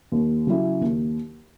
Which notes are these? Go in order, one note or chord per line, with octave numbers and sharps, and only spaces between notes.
D#2
C#3 F#3 C#4 E4
D#2